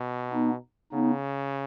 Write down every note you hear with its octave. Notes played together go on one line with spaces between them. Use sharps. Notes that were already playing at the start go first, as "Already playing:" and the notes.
Already playing: B2
B3 D#4
C#3 B3 D#4